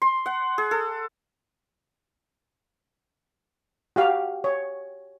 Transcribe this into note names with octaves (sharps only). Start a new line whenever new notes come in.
C6
F#5
G#4
A4
F#4 G4 F5
C#5